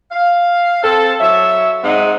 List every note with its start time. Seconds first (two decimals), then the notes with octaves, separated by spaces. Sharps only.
0.11 F5
0.83 C4 A4
1.20 F#3 C#5 E5
1.83 G#2 C4 D#4 G#4 F#5